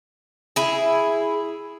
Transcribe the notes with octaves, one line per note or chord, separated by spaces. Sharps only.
E4 G#4